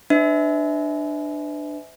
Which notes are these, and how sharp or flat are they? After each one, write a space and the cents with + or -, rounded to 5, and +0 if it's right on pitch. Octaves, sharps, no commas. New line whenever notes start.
D4 +20 B4 +45 E5 -25